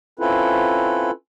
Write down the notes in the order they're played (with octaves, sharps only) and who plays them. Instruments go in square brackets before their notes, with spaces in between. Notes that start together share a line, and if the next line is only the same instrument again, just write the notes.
[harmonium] C4 C#4 E4 F4 A4 B4